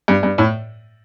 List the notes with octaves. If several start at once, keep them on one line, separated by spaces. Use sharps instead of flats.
G2
G2
A2